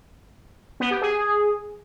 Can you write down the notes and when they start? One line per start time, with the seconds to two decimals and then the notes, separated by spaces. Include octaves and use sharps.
0.80 B3
0.91 G4
1.02 G#4